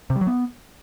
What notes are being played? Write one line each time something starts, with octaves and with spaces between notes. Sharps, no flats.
C3
G3
F#3
B3